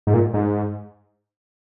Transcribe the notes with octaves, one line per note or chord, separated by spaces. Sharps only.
G#2
A#2
G#2